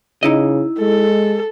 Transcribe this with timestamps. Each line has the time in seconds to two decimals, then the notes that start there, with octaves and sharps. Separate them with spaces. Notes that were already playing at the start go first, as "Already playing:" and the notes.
0.23 C#3 D#4 E4 D#5
0.79 G#3 A4